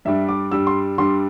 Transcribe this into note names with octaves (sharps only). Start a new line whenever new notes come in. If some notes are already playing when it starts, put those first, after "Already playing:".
G2 G3 D4 E5
D6
G2 G3 D4 E6
C6
G2 G3 D4 C6